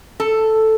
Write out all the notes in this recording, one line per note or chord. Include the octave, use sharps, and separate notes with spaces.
A4